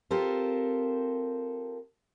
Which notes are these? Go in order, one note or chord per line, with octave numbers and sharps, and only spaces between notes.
C4 F4 G4 A4 A#4 C5